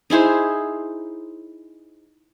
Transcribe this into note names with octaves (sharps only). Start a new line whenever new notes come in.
D#4 E4 G#4 C5